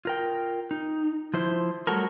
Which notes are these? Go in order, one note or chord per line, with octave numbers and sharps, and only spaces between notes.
F4 A#4 G5
D#4
F3 E4 C5
F#3 G3 A3 F#4 A4 A#4